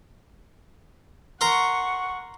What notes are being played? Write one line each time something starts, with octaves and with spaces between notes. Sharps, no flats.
A#4 F#5 C6 C#6